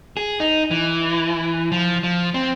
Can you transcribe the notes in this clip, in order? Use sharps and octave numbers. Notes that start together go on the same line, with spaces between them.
G#4
D#4
E3
F3
F3
C4